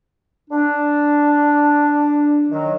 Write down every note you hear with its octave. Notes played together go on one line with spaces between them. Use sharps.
D4
D#3 F#3